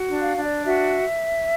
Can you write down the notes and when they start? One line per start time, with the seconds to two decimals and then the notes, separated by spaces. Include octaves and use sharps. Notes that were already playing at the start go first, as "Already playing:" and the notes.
Already playing: F#4
0.09 D4
0.22 F5
0.36 D4
0.44 D5
0.65 F#4 E5